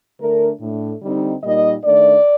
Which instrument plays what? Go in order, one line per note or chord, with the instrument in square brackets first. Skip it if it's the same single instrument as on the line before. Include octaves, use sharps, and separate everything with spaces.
[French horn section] D3 A3 D4 A#4
A2 A3 D4
D3 G3 C4 D#4
A#2 G3 A#3 D#4 D#5
D#3 A3 D4 D5